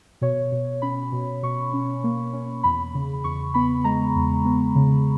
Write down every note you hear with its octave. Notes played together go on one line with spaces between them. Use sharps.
B2 C#5
B2
C#4 B5
B2
B2 C#6
C#4
A#3
C#4
E2 B5
C#3
E2 C#6
B3 B5
G#3 A#5
E2
B3
C#3